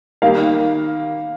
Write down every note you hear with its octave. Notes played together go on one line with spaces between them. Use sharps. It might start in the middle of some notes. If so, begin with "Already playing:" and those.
D#3 G3 A#3 F5